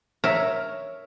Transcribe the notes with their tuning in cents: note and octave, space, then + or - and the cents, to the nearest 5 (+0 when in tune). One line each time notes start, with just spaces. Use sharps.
A#4 +0 C#5 +0 E5 +0